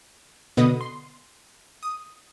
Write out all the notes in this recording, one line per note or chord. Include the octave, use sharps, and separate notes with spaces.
B2 D3 B3 B4 D#5 D#6
C6
D#6